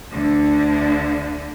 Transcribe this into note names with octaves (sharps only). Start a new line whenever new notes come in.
D2 D3